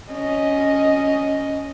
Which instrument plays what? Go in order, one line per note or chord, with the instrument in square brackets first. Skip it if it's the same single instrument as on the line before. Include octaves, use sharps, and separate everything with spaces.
[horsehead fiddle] C#4 D#5